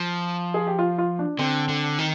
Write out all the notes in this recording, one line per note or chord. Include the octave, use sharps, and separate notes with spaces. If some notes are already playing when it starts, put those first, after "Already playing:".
Already playing: F3
G#4
G4
F4
F4
D4
D3 C4
D3
D#3